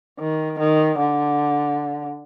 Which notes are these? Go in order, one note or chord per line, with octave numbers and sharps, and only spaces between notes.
D#3
D#3
D3